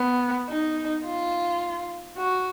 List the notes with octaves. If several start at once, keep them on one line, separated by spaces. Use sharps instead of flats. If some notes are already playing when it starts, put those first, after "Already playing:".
Already playing: B3
D#4
F4
F#4